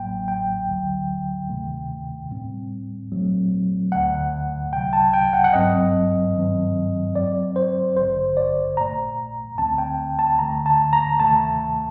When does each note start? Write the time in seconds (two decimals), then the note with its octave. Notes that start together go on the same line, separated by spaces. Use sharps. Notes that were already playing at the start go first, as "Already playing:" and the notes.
Already playing: A1 A2 F#3 A#3 G5
0.28 G5
0.69 D2 D3 F#3
1.49 D2 C3 D#3 A3
2.30 A2 G3 C4
3.11 A#1 A#2 F#3 A3 C4
3.92 D2 D3 A3 F#5
4.73 C2 C3 F#3 G5
4.93 A5
5.14 G5
5.33 F#5
5.44 F#5
5.53 G1 G2 F#3 C4 D#5
6.34 G2 D#3 F#3 C4
7.15 F#2 F#3 C4 D5
7.56 C5
7.96 A1 G2 D3 C5
8.37 D5
8.77 A#1 A#2 A3 A#5
9.58 D2 D3 A3 C4 A5
9.78 G5
10.19 A5
10.39 D2 D3 A3 A#5
10.66 A5
10.93 A#5
11.20 D2 C3 D#3 A3 A5